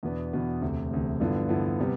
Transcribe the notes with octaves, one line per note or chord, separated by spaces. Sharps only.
E2 B2 B3 D4
E2 B2 B3 D4
E1 D2 C3
E1 D2 C3
G2 D3 F3 B3 E4
G2 D3 F3 B3 E4
C3 G3 B3